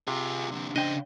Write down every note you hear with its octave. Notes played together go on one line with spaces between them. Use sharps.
C3 F4 G#4
F2 D3
C#3 D4 C5 D#5 G5